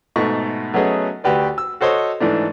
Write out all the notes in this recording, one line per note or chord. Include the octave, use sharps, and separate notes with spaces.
G#2 B2 A3 C#6
F#3 A3 B3 C#4 G#4 D#5
D2 F#4 G4 B4 D5
E6
F#4 A4 C5 C#5 D#5
G#2 E3 A3 D4